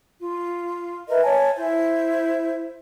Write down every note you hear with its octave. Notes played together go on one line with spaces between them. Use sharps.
F4
A#4 B4 D#5 E5
C#5 G#5 A5
E4 C5